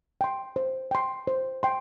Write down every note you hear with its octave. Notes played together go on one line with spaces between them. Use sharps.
G5 C6
C5
G5 C6
C5
G5 C6